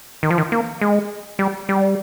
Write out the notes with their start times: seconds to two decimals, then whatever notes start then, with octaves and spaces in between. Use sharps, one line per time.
0.23 D#3
0.30 F3
0.38 D#3
0.52 A#3
0.81 G#3
1.39 G3
1.69 G3